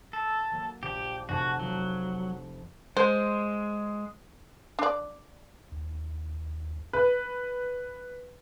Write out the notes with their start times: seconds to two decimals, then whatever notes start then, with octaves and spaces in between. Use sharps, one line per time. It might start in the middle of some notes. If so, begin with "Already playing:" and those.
0.13 A4
0.51 F#3 A#3
0.83 A#1 G4
1.29 F1 F#4 G#5 A5
1.59 F3 F#3
2.97 G#3 C5
4.79 D4 D5
5.72 D#2
6.93 B4